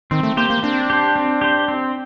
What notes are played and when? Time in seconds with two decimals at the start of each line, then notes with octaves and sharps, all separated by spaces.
0.11 D#3 C4
0.23 A3
0.37 A#3 G4 C5
0.50 A#3
0.63 C4 D4
0.90 G4 C5
1.16 C4
1.41 G4 C5
1.68 C4